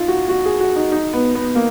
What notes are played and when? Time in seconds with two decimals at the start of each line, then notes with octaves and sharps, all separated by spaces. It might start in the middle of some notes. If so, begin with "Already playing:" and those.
Already playing: D#4 F4
0.08 F#4
0.29 F#4
0.46 G#4
0.60 F#4
0.76 D#4
0.92 D#4
1.13 B3
1.35 B3
1.55 A#3